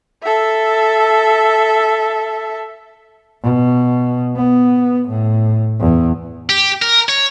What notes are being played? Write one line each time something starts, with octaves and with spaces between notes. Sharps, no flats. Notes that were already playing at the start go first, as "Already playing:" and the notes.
A4 E5
B2
B3
A2
E2
G4
A#4
C#5